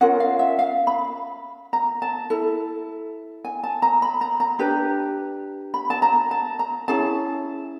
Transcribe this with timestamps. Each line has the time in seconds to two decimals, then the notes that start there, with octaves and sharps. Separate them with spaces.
0.01 C#4 F4 A#4 F#5
0.20 F5
0.39 E5
0.59 F5
0.87 B5
1.73 A#5
2.02 A5
2.30 E4 A4
3.45 G#5
3.63 A5
3.82 A#5
4.02 B5
4.21 A#5
4.40 A#5
4.59 D4 G4 B4
5.74 B5
5.90 A5
6.02 A#5
6.31 A5
6.59 A#5
6.88 C#4 E4 G#4 A5